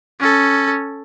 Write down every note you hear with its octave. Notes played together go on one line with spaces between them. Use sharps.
C#4 A4